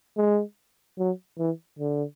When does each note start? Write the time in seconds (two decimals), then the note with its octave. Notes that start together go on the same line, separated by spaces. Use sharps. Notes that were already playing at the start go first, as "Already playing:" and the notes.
0.17 G#3
0.99 F#3
1.39 E3
1.79 D3